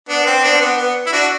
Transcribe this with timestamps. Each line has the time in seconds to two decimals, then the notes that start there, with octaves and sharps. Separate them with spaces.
0.08 B3 D4
0.22 B3
0.26 C4
0.43 B3 D4
0.54 C4
0.60 B3
0.77 B3
1.06 E4
1.13 D4 F#4